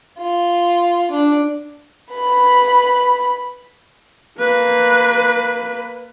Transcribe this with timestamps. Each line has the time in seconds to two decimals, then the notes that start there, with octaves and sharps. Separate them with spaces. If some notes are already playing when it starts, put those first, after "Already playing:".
0.18 F4
1.11 D4
2.15 B4 B5
4.39 A#3 B4